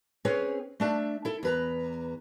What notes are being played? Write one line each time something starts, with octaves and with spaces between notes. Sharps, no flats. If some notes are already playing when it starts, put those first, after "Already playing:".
C4 C#4 G#4 B4 C#5
A3 D4 E5
E4 A4
E2 B4 A#5